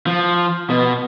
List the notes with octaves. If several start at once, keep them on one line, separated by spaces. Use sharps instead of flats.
F3
B2